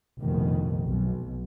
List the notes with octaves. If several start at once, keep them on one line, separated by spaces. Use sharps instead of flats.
F1 A#1 B2 D#3
B1